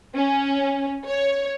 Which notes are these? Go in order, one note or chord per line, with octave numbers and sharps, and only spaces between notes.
C#4
C#5